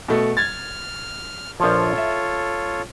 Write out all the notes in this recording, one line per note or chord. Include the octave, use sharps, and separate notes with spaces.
B2 A3
F6 G#6 A6
A#1 F3 F4 A4 C#5
E5